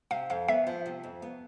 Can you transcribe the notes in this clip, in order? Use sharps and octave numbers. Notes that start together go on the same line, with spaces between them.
C3 F5
F2 F5
B3 E5
F3
C3
F2
B3